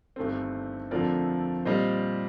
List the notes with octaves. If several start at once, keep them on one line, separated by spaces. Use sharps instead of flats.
G1 G2 D#3 A3 C4
F2 D3 F3 A3 C4 A#4 D5
A#2 G3 C4 C5 D#5